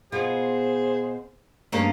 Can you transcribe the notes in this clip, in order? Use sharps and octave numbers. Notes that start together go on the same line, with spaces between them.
B2 F4 G#4 C5
G2 G#3 A#3 C#4 D4